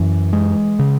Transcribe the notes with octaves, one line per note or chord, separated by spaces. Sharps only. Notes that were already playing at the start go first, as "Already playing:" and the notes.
Already playing: F#2 E3
G#3
C#3